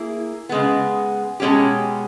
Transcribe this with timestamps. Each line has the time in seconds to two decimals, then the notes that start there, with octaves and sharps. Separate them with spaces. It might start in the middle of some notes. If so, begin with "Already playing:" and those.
Already playing: A#3 E4 G#4
0.49 C#3 G#3 B3
1.40 B2 G#3 C#4 G4